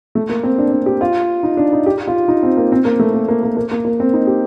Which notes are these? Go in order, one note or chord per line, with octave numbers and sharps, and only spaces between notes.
A3
A#3
C4
D4
D4
G4
F4
D#4
D4
D#4
G4
F4
D#4
C4
A#3
C4
A#3
A3
A#3
A#3
A#3
A#3
A#3
A#3
C4
D#4
G4